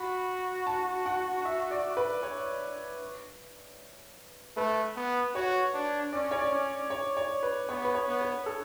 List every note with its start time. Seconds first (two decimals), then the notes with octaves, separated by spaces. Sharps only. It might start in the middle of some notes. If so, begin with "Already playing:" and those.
Already playing: F#4 B5
0.67 A5
1.06 F#5
1.45 E5
1.71 D5
1.97 B4
2.23 C#5
4.56 A3 B4
4.96 B3
5.35 F#4 C#5
5.74 D4
6.13 C#4 D5
6.31 C#5
6.39 D5
6.52 C#4
6.90 C#5
7.17 C#5
7.43 B4
7.69 B3 C#5
7.85 B4
7.95 C#5
8.08 B3
8.21 B4
8.46 A4